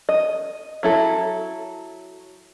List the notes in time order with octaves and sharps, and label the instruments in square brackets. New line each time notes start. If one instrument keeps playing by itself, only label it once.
[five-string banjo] D#5
F#3 E4 A4